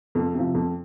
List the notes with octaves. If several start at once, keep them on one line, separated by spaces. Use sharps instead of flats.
F2
C3 F3
F2